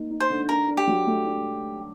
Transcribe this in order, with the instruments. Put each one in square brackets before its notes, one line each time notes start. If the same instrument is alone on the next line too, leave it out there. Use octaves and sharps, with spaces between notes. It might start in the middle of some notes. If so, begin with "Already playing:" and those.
Already playing: [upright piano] A#3 D#4
D#4
[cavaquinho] C5
[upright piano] D3
[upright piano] D4 [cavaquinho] A#4
[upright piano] D4
[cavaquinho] G4
[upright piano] F#3
A3
D4